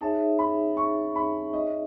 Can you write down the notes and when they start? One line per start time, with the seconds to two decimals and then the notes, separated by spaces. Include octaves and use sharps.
0.01 D#4 G#4 C#5 E5 A5
0.39 B5
0.77 C#6
1.16 B5
1.53 D#5